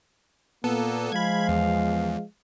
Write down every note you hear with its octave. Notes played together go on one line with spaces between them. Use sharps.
A#2 A#3 B3 A4
F3 G#3 F5 B5 G#6
E2